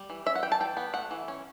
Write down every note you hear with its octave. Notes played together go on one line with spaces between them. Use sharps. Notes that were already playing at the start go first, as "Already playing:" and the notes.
Already playing: G3
E3
C#4 E5
F#5
E3 G5
A5
E3 G5
B3
A3 F#5
E3
C#4